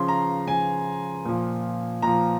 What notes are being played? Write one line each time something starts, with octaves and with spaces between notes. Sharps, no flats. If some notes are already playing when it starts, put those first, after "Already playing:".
Already playing: C#3 F3 C6
A#5
C#3 F3 G#5
A#2 F3
A#2 F3 A#5